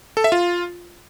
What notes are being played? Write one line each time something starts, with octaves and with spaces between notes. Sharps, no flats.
A4
E5
F4